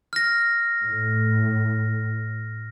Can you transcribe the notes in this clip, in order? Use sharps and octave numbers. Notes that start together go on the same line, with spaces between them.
F6 A#6
A2